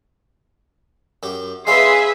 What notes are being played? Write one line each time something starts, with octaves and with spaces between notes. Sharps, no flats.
F#2 G4
G#3 C#4 F4 G#4 B4 E5 C6